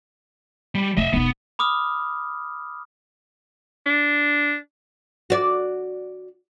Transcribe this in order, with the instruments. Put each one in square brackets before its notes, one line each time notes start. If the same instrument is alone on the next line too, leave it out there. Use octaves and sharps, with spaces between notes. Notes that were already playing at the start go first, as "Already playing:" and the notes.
[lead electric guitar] G3
[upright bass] F1 [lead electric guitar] D#5 E5
[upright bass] E1 D#4 [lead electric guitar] B3
[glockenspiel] B5 D6 D#6 F6
[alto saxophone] D4
[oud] F#4 D5